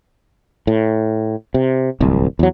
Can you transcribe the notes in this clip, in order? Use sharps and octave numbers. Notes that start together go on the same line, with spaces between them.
A2
C3
D1 C2
E2 F#3